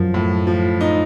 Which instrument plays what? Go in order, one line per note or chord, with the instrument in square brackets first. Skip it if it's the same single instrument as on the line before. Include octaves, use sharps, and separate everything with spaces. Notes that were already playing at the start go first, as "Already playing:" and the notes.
Already playing: [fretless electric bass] F#2 [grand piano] F3
[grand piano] A2
F3
D#4